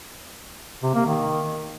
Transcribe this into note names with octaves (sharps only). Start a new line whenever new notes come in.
C3
A#3
D#3